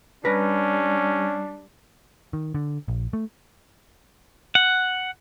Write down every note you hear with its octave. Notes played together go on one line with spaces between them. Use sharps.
G3 C#4 D4 B4 A#5
D#3
D3
A#1
A3
F#5